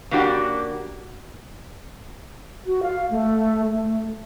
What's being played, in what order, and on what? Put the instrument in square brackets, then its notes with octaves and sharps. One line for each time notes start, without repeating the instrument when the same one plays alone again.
[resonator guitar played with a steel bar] C#3 A#3 D4 F#4 G4
[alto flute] F#4
F5
A3
A3